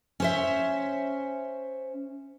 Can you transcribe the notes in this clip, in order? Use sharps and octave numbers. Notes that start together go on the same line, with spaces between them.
C#4 C5 E5